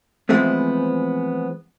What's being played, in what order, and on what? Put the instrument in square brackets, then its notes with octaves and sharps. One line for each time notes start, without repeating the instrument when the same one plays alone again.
[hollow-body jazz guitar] E3 F3 G#3 A3 B3 C4